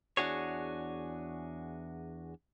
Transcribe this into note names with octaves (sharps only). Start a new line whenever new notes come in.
E2 D4 F#4 G#4 C#5